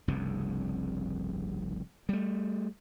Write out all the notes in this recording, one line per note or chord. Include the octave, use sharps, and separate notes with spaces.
F1 C2 G2 C#3
G3 A3